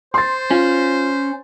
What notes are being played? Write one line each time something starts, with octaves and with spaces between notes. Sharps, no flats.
C5 C6 A6
C#4 F4